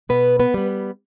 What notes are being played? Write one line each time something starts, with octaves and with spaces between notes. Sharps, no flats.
B2 B3 B4
B3 B4
G3 B3